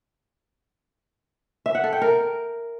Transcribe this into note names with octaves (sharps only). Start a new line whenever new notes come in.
E5
F#5
A4
G5
A#4